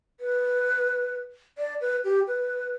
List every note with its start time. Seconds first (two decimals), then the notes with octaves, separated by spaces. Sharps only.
0.20 B4
1.58 D5
1.81 B4
2.04 G4
2.28 B4